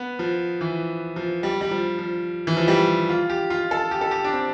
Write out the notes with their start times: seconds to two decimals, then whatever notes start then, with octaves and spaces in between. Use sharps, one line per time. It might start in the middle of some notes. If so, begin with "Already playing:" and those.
Already playing: B3
0.19 F3
0.61 E3
1.16 F3
1.43 G3
1.61 G3
1.71 F3
1.99 F3
2.47 E3
2.57 F3
2.68 G3
3.09 F4
3.30 G4
3.50 F4
3.71 A4
3.91 G4
4.01 A4
4.11 G4
4.24 D4
4.33 C4